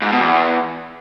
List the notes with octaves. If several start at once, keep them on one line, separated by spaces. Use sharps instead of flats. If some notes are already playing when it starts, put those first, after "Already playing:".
G#2
B2
E2